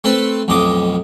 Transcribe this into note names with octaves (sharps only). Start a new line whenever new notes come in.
A3 C4 A4 B4
B1 F2 A2 D#5 D6